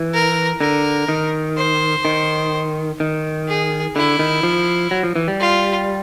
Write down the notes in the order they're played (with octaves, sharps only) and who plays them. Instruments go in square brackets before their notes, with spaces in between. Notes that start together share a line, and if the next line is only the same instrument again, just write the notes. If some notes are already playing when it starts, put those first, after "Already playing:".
Already playing: [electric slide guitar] E3
[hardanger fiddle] A#4
[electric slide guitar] D3 [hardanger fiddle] A#4
[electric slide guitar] D#3
[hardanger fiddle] C5
[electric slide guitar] D#3
D#3
[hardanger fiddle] G#4
[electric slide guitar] D3 [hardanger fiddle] E4
[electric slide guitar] D#3
F3
F#3
F3
E3
G3
[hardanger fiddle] F4